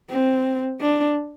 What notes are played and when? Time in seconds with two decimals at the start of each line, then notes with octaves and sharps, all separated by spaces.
0.10 C4
0.81 D4